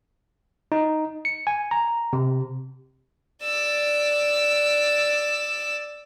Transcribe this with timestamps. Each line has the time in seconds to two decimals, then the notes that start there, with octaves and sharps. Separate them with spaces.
0.72 D#4
1.25 C#7
1.47 G#5
1.71 A#5
2.13 C3
3.44 D5 E6